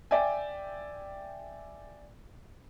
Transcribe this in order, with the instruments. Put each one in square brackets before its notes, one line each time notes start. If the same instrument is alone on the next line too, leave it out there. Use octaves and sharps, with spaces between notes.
[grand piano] D5 E5 G5 G#5